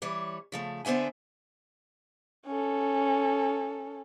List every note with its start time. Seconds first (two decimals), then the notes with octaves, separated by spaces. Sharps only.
0.02 E3 G3 C#5
0.52 C#3 F3 A3
0.85 D3 B3 C5 E5 G#5
2.47 C#4 A4